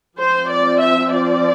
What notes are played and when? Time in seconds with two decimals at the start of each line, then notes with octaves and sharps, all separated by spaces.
0.18 F3 C4 C5
0.49 D5
0.80 E5
1.12 D5